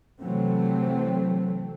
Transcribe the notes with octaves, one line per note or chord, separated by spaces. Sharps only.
C3 E3 F#3 A3 C4